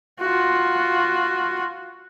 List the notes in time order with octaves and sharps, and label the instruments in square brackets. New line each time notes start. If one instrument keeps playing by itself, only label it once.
[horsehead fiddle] F4 F#4